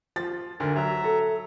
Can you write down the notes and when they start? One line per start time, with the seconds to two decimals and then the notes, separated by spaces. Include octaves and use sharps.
0.16 F3 A6
0.60 D2 G#2 A#4
0.76 F#3 E5 A#5
1.04 A4